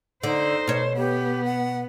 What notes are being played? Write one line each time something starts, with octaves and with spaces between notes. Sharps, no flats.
D3 D#4 C5
B2 C#5
B3 G4
F#5